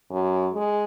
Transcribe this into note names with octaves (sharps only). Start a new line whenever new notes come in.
F#2
G#3